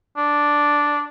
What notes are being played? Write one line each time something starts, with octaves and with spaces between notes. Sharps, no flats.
D4